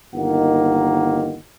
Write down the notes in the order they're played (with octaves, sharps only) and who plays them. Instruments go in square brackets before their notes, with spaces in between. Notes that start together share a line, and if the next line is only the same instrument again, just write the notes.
[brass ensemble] G1 D#3 A#3 D#4 F#5